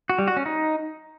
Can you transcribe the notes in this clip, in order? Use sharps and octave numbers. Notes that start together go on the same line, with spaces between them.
F#4
G3
F#4
C#4
D#4